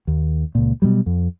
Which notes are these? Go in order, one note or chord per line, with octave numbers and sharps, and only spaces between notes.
D#2
C#2 A#2
B2 D3 F#3 G3
F2